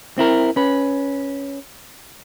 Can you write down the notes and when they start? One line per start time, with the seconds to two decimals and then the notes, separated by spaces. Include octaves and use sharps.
0.18 C4 E4 A#4
0.56 C#4 B4